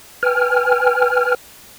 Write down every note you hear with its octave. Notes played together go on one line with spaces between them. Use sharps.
B4 G5 G#5 F6